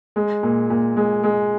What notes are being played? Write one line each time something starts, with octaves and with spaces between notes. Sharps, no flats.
G#3
A#2
A#2
G#3
G#3